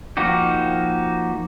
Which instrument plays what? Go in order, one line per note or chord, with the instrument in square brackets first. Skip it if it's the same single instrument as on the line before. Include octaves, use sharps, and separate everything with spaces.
[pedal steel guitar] F3 A#3 D#4 F#4 G4